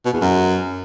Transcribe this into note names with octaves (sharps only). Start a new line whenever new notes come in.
B2
E2
F#2